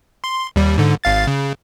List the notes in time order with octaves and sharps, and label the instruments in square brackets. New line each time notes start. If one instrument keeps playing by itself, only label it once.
[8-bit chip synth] C6
D#2 G3
G#2 D3
G#1 F5 A6
C#3